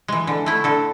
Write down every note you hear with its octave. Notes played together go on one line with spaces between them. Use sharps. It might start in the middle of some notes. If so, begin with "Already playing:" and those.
E3 G#3
D3
A3 E4
D3 A4